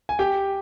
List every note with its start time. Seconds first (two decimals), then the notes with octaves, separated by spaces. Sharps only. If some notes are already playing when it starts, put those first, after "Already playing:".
0.09 G#5
0.19 G4 G5